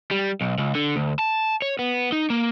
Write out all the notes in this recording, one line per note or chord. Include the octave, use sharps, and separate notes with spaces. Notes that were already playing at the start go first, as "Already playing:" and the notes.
G3
B1
C#2
D3
D2
A5
C#5
B3
D#4
A#3